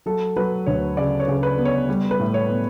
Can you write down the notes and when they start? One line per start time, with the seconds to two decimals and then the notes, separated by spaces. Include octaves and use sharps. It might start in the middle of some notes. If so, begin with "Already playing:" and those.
0.06 F#3 A4
0.36 F#3 B4
0.66 D2 C#5
0.97 C#3 D5
1.20 C#5
1.28 C#3
1.43 B4
1.58 B3
1.65 C#5
1.89 G3
2.11 B4
2.19 A2
2.34 C#5
2.49 B3